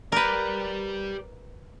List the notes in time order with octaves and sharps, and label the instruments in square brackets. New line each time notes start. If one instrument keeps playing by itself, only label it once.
[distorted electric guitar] G4 D5 [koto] A#4 B4